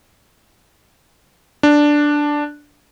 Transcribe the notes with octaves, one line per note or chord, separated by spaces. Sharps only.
D4